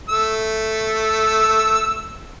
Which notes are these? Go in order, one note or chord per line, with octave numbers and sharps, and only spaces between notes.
A3 E6